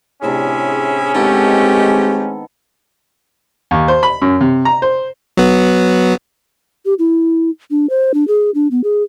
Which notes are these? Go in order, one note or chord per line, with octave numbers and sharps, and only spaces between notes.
A2 C3 C#4 D4 E4 G#4
D#3 G#3 A3 B3 C4 G4 A4
D#2
C5
B5
F#2
C3
A#5
C5
F#3 B3
G4
E4
D4
C5
D4
G#4
D4
B3
G#4